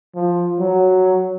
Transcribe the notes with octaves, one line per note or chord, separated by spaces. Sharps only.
F3
F#3